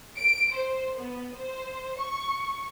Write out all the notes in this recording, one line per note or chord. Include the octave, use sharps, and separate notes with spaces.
D7
C5
B3
C5
C#6